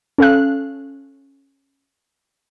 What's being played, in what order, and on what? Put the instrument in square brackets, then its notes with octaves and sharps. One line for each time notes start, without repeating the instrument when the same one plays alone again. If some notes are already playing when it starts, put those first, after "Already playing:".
[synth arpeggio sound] C#4 A4 F5 F#6